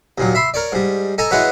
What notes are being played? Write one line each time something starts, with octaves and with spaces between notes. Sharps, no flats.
D#2 A#2 F#3
E5 B5 C6
A#4 C#5 D5
G#2 G3
A4 D#5 G#5 A#5
E3 G#3 B3 F#4 B4 C#5